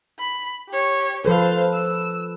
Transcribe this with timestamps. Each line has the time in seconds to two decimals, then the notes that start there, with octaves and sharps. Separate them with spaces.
0.19 B5
0.69 G4 C#5
1.25 F3 A4 B4 C5 F5
1.73 E6